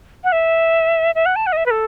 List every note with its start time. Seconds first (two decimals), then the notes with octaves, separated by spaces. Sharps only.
0.24 F#5
0.32 E5
1.15 E5
1.26 F#5
1.36 A5
1.47 F#5
1.52 D#5
1.57 E5
1.66 B4
1.71 A4